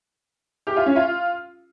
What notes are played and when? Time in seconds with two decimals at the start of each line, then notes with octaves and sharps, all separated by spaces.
0.67 G4
0.76 F4
0.86 C#4
0.96 F4